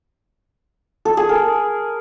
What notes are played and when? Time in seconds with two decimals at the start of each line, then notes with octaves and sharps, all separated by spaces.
1.05 A4
1.17 G#4
1.29 A#4